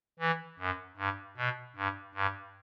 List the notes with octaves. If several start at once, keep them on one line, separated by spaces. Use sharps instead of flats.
E3
F#2
G2
B2
G2
G2